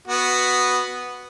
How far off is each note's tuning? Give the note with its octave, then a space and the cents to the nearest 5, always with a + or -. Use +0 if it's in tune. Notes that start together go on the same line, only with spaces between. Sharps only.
B3 +0 F#4 +0